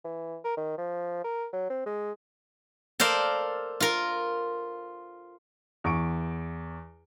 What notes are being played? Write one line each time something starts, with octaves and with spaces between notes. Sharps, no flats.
E3
A#4
D#3
F3
A#4
F#3
C4
G#3
A4 A#4 C5 D5 F5
F4 A#4
E2 C#6 D7